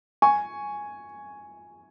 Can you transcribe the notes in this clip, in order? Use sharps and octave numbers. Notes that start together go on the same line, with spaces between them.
G#5 C#6